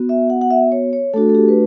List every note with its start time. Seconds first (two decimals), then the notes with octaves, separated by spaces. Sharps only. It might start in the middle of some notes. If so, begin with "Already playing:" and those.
Already playing: B3 F#4
0.09 E5
0.30 F#5
0.41 F#5
0.51 E5
0.72 C#5
0.93 C#5
1.14 A3 D4 F#4 A4
1.29 A4
1.35 G4
1.48 B4